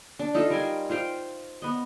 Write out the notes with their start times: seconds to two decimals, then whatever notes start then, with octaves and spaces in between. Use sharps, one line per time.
0.19 D4
0.35 D#4 F4 A4
0.50 G3 A#4 G#5 C6
0.90 F4 C5 F5 G5
1.62 B3 D#5